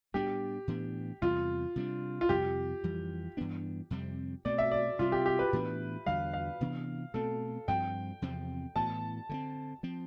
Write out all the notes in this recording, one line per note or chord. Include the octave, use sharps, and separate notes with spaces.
A2 G3 B3 D4 G4
A2 E3 B3 D4
E2 C3 G3 F4
C3 G3 D4
F4
F2 C3 G3 G4
F2 E3 G3
G2 E3 B3 D4
F2 C3 G3 C4
B2 A3 C4 D5
E5
D5
C3 G3 C4 F4
G4
G4
B4
A2 E3 B3 D4
E2 D3 G3 F5
F5
C3 E3 B3 D4
B2 A3 C4 A4
G2 F3 C4 G5
E2 C3 F3 C4
A2 E3 B3 A5
D3 A3 C4
F3 C4